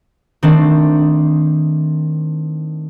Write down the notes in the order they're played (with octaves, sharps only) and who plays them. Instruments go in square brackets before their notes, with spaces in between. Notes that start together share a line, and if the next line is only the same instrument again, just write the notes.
[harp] D#3 A3 C4 D4